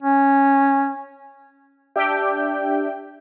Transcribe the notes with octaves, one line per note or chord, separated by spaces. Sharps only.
C#4
D4 G4 E5 G5